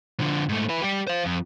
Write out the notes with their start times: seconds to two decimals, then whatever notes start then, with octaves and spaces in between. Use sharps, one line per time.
0.20 D3 F3
0.49 G#2 A3
0.69 E4 B4
0.82 G3 G4
1.07 C5 F5
1.26 F2